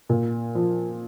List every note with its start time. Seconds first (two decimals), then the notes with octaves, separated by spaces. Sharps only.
0.09 A#2
0.55 F3